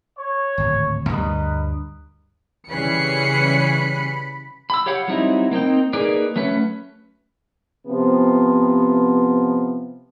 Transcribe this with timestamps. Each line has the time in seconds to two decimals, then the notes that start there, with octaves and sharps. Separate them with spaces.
0.18 C#5
0.58 D1 G#1
1.09 D2 G2 G3 A#4 B4 D#5
2.70 C#3 E3 G3 C#4 B5 F#6 C7 C#7
4.70 B5 E6
4.86 G4 C#5 F5 F#5 B5
5.08 F#3 G3 C4 D#4 E4
5.51 A#3 C4 D#4 G5
5.93 A#3 D#4 G#4 B4 D5
6.36 F#3 A3 C#4 B4
7.87 C3 F3 B3